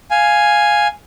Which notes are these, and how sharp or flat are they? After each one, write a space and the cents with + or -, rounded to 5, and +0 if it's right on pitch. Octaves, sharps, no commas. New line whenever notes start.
F5 +0 G#5 +0